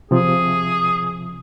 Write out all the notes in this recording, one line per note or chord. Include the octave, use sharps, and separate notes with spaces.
C3 F3 G#4